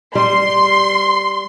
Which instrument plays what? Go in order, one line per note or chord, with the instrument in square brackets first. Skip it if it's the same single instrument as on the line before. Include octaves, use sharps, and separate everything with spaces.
[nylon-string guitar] G3 [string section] C6